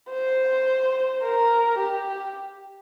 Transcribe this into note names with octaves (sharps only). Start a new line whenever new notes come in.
C5
A#4
G4